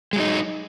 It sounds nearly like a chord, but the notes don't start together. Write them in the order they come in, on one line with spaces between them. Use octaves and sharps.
G#3 F#3 D#4